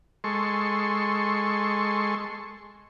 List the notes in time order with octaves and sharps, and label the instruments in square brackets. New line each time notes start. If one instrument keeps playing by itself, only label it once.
[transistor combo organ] G#3 A4 C6 C#6